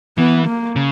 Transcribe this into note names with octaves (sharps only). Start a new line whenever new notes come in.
E3 B3
A#3
C#3